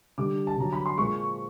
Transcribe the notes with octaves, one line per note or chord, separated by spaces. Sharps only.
D3 G3 D6
A5
D3 F#3 A#5
B5
C6
A#2 F3 G#3 C#6